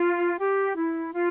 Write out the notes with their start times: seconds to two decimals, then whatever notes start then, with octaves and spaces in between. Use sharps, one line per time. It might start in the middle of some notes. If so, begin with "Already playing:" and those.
Already playing: F4
0.38 G4
0.75 E4
1.13 F4